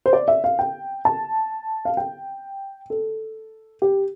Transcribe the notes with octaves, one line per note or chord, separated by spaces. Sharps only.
C5
D5
E5
F5
G5
A5
F5
G5
A4
G4